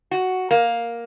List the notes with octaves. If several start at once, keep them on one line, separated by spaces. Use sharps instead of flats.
F#4
A#3